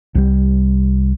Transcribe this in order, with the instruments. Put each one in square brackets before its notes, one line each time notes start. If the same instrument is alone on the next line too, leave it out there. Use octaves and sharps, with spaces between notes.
[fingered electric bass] C2 G3